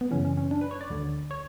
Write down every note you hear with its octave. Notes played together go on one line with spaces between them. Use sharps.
B3
F#2 C#3 E3 C#4
C#4
C#4
D4
B4
C#5
D5
D2 D3
C#5